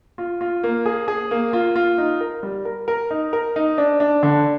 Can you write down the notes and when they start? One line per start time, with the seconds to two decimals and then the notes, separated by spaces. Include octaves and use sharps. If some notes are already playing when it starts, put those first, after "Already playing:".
0.18 F4
0.41 F4
0.63 A#3
0.86 G#4
1.08 G#4
1.31 A#3
1.53 F4
1.76 F4
1.98 D#4
2.21 A#4
2.43 G3
2.65 A#4
2.88 A#4
3.11 D#4
3.33 A#4
3.56 D#4
3.78 D4
4.00 D4
4.23 D3